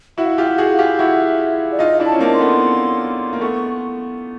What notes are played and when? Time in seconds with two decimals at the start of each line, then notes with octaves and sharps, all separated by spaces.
0.18 E4 F#4 E5
0.26 F5
0.35 E5
0.38 F4 G4
0.45 F#5
0.58 F#4 G#4
0.72 F5
0.79 F4 G4
0.99 E4 F#4 E5
1.72 D5
1.79 D#4 F4 D#5
2.00 D4 E4
2.06 A5
2.12 C#4
2.19 A#3 C4
2.33 C6
2.40 A3 B3
3.33 A#3
3.41 A3 B3 C#6